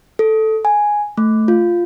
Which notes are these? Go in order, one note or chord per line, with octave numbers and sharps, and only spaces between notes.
A4
G#5
A3
F4